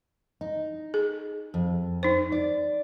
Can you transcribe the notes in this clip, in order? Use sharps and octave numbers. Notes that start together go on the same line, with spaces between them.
D#4
G#4
F2
D#4 C5
D5